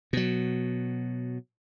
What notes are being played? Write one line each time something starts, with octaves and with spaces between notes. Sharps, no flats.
B2 F#3